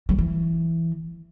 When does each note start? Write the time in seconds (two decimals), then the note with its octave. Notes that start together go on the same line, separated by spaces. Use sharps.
0.09 F#3
0.18 E3